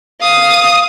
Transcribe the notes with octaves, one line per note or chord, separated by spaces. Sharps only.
F5 D#6